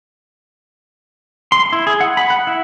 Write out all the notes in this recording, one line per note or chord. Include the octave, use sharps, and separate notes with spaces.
C6
E4
G#4
F#5
B5
F#5
E4